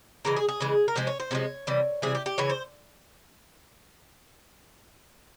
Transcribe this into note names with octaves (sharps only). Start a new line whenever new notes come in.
C#3 E3 G#3 A#4
G#4
G#4
C#3 E3 G#3
A#4
C3 F3 G#3 C5
C#5
C5
C3 F3 G#3 C#5
C3 E3 G3
C3 E3 G3 G#4
G4
G4
C#3 E3 C#5
C5